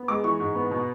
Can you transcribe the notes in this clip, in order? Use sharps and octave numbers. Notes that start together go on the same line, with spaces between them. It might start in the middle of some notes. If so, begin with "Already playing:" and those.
Already playing: B3
G#3 D6
E3 C#6
G#2
B3
B2